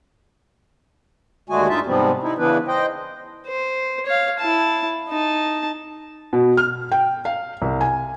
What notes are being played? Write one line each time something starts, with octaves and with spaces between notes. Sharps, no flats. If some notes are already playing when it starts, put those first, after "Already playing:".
D#2 D3 G#3 A3 F#4 G#5
G2 D#4 F4 E5 A5
G#2 C3 F3 G3 B3 C4
D#4 E4
C#3 E3 B3 D4 E4 B4
C5 D#5 G5
C5
C#5 F5
E4 A5
D#4 A5
B2
F6
G5
F5
C2
G#5